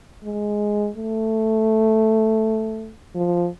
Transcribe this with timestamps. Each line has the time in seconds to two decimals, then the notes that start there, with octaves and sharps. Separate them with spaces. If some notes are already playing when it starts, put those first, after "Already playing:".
0.24 G#3
0.97 A3
3.15 F3